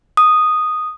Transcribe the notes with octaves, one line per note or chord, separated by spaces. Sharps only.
D#6